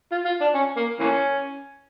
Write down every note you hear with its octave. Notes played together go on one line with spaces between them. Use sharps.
F4
F4
D4
C#4
A#3
E3 A#3 C#4